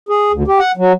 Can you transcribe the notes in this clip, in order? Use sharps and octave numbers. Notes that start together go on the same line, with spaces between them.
G#4
D2
G4
F#5
F#3